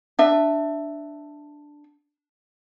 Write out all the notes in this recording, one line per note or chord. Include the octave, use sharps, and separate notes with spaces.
D4 E5